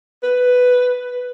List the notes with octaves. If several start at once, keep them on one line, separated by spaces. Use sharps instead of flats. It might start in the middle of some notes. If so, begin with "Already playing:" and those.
B4